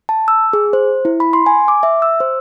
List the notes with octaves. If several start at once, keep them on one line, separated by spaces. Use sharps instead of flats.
A5
E6
G#4
C5
E4
B5
C6
G#5
D6
E5
E6
C5